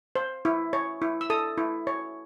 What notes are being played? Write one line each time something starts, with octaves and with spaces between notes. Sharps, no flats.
C5
E4
C#5
E4
E6
A4 D#6
E4
C#5